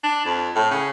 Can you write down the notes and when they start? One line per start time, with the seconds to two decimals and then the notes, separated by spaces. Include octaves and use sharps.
0.04 D4
0.25 F2
0.55 A2
0.71 C#3